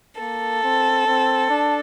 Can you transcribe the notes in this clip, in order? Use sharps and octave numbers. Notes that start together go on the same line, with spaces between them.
A#3 A4
C4
C4
D4